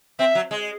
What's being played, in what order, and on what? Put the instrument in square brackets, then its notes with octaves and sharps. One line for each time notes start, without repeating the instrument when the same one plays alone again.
[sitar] C4 [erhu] E5
[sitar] F#3
G#3